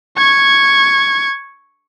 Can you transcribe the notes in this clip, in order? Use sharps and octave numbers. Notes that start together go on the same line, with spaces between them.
C#6 G#6